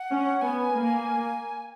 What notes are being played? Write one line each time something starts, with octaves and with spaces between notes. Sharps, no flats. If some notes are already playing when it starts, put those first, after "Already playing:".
Already playing: F#5
C#4
B3 G#5
A#3